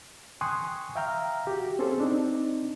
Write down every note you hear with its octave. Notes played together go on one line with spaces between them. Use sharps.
G5 G#5 C6 C#6 D#6 F#6
E5 F5 G5 A#5 F6
F#4 G4
C4 C#4 G#4 A4 C5
C4 D4 D#4